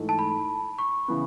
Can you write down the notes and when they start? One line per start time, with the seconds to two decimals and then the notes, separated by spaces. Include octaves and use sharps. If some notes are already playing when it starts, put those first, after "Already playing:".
Already playing: G#2 E3 A3
0.09 A5
0.19 B5
0.79 C#6
1.08 C#3 E3 B3